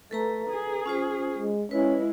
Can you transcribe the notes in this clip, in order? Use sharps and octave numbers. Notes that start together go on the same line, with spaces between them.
A3 A4 B4 A#5
G#4
C#4 F4 C5
G#3
G#3 C#4 E4 B4